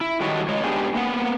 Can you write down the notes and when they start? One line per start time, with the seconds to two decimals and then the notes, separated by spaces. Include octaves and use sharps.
0.01 E4
0.20 D#3 G3 F#4 A4 C#5 D#5
0.49 G#3 C#5 D#5
0.64 G#2 G3 B3 D4 G4 G#4
0.95 A#3 B3 F#5